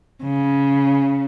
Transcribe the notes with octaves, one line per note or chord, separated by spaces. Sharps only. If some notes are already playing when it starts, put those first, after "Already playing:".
C#3